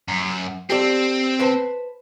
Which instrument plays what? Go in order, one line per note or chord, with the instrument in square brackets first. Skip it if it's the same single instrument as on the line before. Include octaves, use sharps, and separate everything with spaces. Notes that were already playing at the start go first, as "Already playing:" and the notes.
[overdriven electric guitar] F#2
[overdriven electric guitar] C4 [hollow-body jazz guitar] G4 A4 D5
[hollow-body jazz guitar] B4 C5 A5